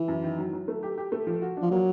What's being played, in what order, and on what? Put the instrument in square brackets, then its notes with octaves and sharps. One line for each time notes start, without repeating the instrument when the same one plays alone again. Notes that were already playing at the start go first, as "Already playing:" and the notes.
Already playing: [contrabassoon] E3
[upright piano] F#2
D#3
F#3
F#3
A3
G4
G4
A3
F3
F#4
[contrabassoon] F3 [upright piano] D4
[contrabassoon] F#3 [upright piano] A#3